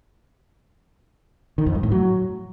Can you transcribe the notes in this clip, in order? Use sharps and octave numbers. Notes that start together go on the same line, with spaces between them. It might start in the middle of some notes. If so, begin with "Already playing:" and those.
D#3
F2
G2
A2
F#3